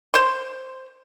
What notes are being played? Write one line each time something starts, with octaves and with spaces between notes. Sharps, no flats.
C5 C6